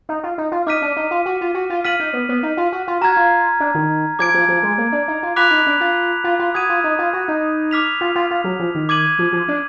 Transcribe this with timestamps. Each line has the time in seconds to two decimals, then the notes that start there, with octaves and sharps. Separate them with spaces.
0.09 D#4
0.23 F4
0.38 D#4
0.52 F4
0.66 D#4 D6 F6 B6 D#7
0.82 D4
0.96 D#4
1.11 F4
1.26 F#4
1.41 F4
1.54 F#4
1.70 F4
1.84 F4 F6 B6 D#7 F#7
1.99 D#4
2.13 B3
2.29 B3
2.43 D#4
2.57 F4
2.72 F#4
2.87 F4
3.01 F#4 A#5 F6 G#6
3.17 F4
3.60 D4
3.75 D#3
4.19 F3 D6 G#6 D7
4.34 F3
4.48 F3
4.63 G#3
4.78 A#3
4.92 D4
5.08 D#4
5.23 F4
5.36 F4 B5 D6 F#6 B6 F7
5.51 D#4
5.67 D4
5.81 F4
6.24 F4
6.39 F4
6.54 F#4 D#6 G#6 D#7
6.69 F4
6.84 D#4
6.99 F4
7.13 F#4
7.28 D#4
7.71 D6 F6 B6 F7
8.01 F4
8.15 F4
8.31 F4
8.44 F#3
8.59 F3
8.75 D#3
8.89 D6 G#6 D#7 F#7
9.19 F3
9.32 F3
9.48 D4